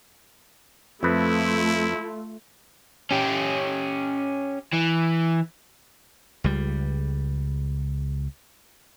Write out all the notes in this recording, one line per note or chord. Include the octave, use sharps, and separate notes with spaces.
F2 A3 E4 F4 B4
C#4 G4
E3
C#2 G3